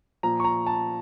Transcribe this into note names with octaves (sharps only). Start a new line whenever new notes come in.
A#2 F3 A#5
C#6
A#5
A5